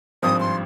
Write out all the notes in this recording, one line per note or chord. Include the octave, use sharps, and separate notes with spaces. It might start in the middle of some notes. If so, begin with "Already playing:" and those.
G#1 G2 F3 C4 D#6
C6